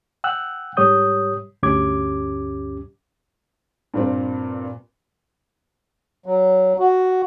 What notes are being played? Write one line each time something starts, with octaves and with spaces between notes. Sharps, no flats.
F#5 G5 E6 F#6
G#2 G3 G4 C#5 D#6 G6
D2 G2 C#4 G4 D6 G#6
G2 A#2 C4
F#3
F#4